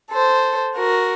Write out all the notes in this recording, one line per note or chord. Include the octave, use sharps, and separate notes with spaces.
A4 C5
F#4 A#4